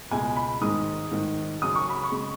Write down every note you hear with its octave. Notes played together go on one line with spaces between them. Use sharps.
C#2 B2 G#3 G#5
B5
G#2 D#3 G#3 D#6
G#2 D#3 G#3
F#2 C#3 F#3 D#6
C#6
B5
C#6
C#3 G#3